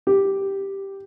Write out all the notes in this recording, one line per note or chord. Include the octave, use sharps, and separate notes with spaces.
G4